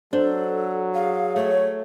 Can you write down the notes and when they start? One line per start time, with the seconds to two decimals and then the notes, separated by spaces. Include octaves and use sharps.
0.13 F#3 D4 A4 C5
0.94 G#4 F5
1.36 A3 C#5